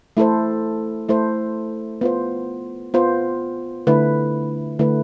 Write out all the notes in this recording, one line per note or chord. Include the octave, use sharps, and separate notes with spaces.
A3 E4 A4 C5
A3 E4 A4 C5
B3 F4 C5
B3 F4 C5
D3 A3 E4 B4
D3 A3 E4 B4